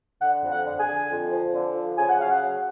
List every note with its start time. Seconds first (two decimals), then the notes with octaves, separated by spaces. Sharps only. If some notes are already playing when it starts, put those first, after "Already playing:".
0.22 D3 F#5
0.43 F2
0.51 F#5
0.65 D3
0.80 G#5
0.87 D3
1.10 F2
1.31 F3
1.53 D3
1.74 F3
1.97 C#3 G#5
2.09 F#5
2.19 F#3 F5
2.31 F#5
2.42 F#3